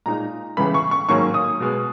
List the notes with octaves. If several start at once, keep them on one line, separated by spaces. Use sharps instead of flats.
A#2 G#3 D#4 A#5
C#2 C#3 E3 B3 B5
C#6
C#6
G#2 D#3 F#3 A#3 C#4 C#6
D#6
B2 G#3 B3